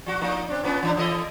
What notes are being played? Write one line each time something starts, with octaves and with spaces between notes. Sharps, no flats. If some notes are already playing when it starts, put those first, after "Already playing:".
F3 F#4
F3 A#3 D#4
C4 D4
A2 B3 C#4
E3 D4
E3 A4 D#5